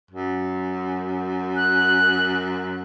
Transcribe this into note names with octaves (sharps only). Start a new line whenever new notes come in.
F#2
F#6